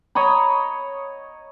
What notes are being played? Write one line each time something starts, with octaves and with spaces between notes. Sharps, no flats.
C#5 D#5 A#5 B5